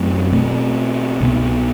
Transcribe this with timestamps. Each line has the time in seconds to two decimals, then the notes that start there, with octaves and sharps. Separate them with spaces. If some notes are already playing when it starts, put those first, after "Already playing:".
Already playing: F#2 F#3 A3 C4
0.32 B2 A3 C4
1.21 C2 B2 F#3 B3